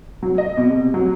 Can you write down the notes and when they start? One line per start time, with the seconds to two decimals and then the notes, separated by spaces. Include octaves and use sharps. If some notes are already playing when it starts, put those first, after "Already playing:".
0.23 F#3
0.38 D#5
0.57 B2
0.70 C3
0.94 F#3